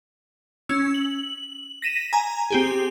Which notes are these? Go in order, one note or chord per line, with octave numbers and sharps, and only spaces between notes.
C#4 E6
F#7
A#6 B6 D#7 E7
G#5 A#5
C4 G4 G#4